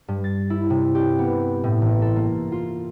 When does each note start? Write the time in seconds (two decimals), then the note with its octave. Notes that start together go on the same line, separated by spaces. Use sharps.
0.08 G2
0.24 A6
0.50 E4
0.70 C3
0.95 G4
1.19 B3
1.64 A2
1.82 A1
2.02 A4
2.16 A#3
2.52 F4